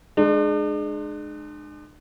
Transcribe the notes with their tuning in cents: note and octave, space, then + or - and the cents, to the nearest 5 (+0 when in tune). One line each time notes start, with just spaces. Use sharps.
G#3 +15 D4 +40